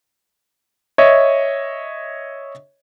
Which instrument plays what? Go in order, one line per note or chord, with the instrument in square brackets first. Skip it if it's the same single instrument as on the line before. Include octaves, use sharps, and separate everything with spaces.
[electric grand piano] C#5 D#5 E5